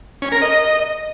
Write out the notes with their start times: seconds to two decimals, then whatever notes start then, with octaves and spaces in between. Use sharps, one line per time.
0.22 C#4
0.32 A#4
0.42 D#5